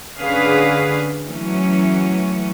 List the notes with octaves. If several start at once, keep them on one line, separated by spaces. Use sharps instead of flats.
D3 C#4 G#4 B4 F5
E3 F#3 A3 C#4